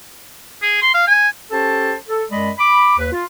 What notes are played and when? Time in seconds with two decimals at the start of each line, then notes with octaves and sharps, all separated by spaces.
0.62 G#4
0.82 C6
0.94 F5
1.08 G#5
1.51 C#4 G4 A4 C5 A5
2.08 A4
2.31 F#2 G#3 D5 D#5 B5
2.59 B5 D6
2.98 D#2 B4
3.12 F4